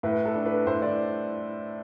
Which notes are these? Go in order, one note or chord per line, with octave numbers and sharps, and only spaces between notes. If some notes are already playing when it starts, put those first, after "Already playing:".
A2 B4
A4
D4
B4
A2 C5
D5